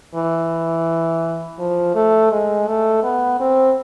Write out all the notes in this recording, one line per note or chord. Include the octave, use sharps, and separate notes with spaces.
E3
F3
A3
G#3
A3
B3
C4